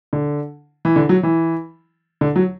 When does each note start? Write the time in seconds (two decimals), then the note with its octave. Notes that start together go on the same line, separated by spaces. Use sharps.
0.13 D3
0.85 E3
0.96 D3
1.09 F#3
1.23 E3
2.21 D3
2.36 F#3